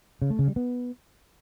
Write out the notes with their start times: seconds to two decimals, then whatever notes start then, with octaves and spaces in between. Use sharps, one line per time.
0.22 C#3
0.30 A3
0.39 C#3
0.48 G3
0.56 B3